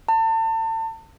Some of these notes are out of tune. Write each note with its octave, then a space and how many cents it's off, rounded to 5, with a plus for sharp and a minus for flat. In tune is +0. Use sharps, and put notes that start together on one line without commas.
A5 +35